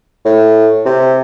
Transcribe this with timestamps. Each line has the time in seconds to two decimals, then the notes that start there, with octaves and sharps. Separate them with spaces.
0.25 A2
0.86 C3